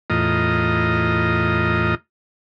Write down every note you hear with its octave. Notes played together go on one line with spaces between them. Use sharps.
E2 A2 F4 D#5 A#5